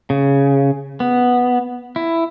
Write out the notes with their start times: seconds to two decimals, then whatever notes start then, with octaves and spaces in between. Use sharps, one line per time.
0.10 C#3
1.00 B3
1.96 E4